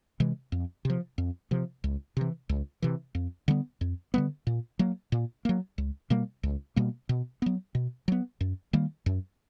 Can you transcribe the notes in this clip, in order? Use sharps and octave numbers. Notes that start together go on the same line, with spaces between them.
C3 E3 G#3
F2
C3 F3
F2
C3 F3
C#2
C3 E3
C#2
C3 E3
F2
D3 G3 B3
F2
D3 G3 B3
A#2
F#3 A#3
A#2
F#3 A#3
C#2
B2 G3 A#3
C#2
B2 G3 A#3
B2
F#3 B3
B2
F#3 B3
F#2
D#3 G3 A#3
F#2